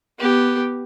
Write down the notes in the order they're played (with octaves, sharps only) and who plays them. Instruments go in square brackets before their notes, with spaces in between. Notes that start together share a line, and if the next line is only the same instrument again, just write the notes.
[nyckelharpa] B3 G4